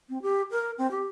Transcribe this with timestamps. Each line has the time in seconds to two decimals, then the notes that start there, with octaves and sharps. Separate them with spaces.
0.09 C4
0.22 G4
0.51 A#4
0.78 C4
0.91 G4